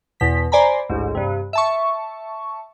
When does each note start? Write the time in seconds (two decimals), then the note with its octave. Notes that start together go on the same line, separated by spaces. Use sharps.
0.20 E2 B2 B6
0.52 C5 D5 G#5 A#5 B5
0.89 A1 D2 G#2
1.15 G2 C3
1.53 E5 A5 C#6